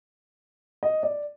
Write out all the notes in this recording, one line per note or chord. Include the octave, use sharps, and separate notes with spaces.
D#5
D5